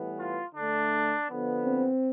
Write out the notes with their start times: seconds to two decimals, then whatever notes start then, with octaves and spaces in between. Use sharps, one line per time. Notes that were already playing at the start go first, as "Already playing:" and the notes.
Already playing: A2 E3 G3 B3
0.17 F4
0.54 D3 A3 D4
1.29 D3 F3 B3
1.65 C4